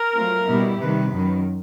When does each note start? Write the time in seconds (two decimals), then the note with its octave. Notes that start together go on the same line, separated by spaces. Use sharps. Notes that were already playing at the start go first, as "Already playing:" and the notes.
Already playing: A#4
0.18 F#3 A3 C4 F4
0.49 B2 G3 B3 E4 G4
0.81 C3 D#3 G3 B4
1.13 F#2 D#3 F#3